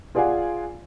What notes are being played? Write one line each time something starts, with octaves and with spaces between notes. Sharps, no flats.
F4 G#4 D5 F5 F#5 G#5